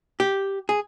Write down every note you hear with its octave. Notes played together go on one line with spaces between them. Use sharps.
G4
G#4